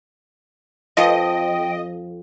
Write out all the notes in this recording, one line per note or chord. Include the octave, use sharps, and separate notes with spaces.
F2 F3 C4 D#5 G5